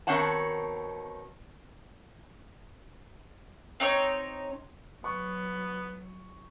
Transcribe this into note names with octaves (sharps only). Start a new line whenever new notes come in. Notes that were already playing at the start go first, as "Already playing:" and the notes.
B2 D#3 C4 C#5 F#5 A5
C4 D#4 C#5
F#3 B3 C#6